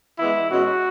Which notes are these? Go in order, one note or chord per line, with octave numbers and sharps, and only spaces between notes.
E3 G#3 B3 E4
B2 G#3 C#4 F#4